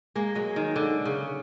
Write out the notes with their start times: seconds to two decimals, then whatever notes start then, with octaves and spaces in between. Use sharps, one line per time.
0.15 G#3 A#3
0.35 F#3 G#3
0.56 D#3
0.76 D3
1.05 C#3